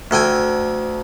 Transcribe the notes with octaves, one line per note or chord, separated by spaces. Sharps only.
D2 A4 G5 G#5